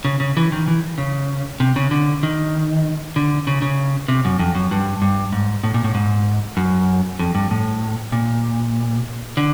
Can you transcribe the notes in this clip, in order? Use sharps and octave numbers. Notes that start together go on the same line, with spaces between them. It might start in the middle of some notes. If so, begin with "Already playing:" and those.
C#3
C#3
E3
D#3
E3
C#3
C3
C#3
D3
D#3
D3
C#3
C#3
C3
F#2
F2
F#2
G2
G2
G#2
A2
A#2
A2
G#2
F#2
F2
G2
A2
A#2
D3